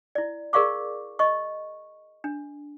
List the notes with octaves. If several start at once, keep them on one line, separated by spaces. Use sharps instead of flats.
E4 D5
G#4 A#4 D5 F5 C#6 D6
D#5 C#6
D4